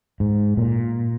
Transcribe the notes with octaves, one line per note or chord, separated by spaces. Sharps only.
G#2
A#2